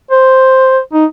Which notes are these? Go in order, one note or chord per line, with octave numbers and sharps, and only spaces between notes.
C5
D#4